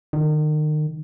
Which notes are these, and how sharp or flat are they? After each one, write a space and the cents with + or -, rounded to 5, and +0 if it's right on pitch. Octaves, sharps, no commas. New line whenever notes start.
D#3 -35